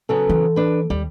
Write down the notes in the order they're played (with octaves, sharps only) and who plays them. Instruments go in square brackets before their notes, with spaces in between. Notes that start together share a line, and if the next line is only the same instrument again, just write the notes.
[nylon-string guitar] C#3 F#3 B3 [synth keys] A4
[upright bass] E3
[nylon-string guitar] D4 B4
[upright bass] D#2 [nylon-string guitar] G3